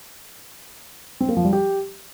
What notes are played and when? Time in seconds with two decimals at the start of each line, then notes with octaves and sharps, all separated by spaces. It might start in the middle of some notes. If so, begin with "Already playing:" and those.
1.21 C4
1.29 A#3
1.37 F3
1.45 G3
1.53 G4